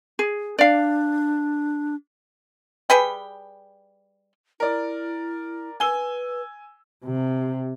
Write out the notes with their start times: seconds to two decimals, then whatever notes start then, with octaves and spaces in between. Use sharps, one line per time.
0.19 G#4
0.59 D4 D5 F5
2.90 G3 G#4 B4 G5
4.60 E4 A#4 D5
5.80 B4 G#5 E6 G7
7.04 C3